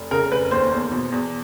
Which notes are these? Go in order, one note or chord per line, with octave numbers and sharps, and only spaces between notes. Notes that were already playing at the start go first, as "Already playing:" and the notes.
Already playing: F1
C#3 A#4
F1 B4
D#2 C5
E2
B2
E2